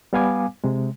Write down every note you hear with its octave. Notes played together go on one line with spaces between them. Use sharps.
G3 B3 F5 G#5 D6
C3 G#3